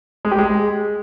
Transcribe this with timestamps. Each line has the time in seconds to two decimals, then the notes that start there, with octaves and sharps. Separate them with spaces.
0.25 G#3
0.32 G4
0.38 G#3